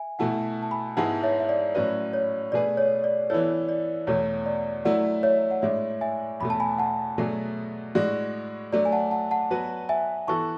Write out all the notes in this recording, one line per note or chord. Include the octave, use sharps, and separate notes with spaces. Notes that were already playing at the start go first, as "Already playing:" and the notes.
Already playing: E5 G#5
B2 A3 E4 F#5 A5
A5
G#5 B5
G#2 G#3 B3 E4 G#4 F#5 A5
C#5 E5
E5
D5
A2 F#3 C#4 F#4 B4 D5
C#5
B2 A3 D4 G#4 B4 D5
C#5
D5
E3 B3 E4 A4 C#5
D5
E2 B2 A3 C#5
D5
F#3 A3 E4 D5 F#5
C#5 E5
F#5
A2 G#3 D4 C#5 E5
E5 G#5
E2 B2 A3 B5
A5
G#5 B5
F#5 A5
B2 F#3 A3 D4 G#4
A2 G#3 D4 F#4 D5
F#3 A3 D4 D5
G#5
F#5 A5
F#5 A5
F#5 A5
F#3 B3 F#4 B4
E5 G#5
E3 B3 F#4 A4 A5 C#6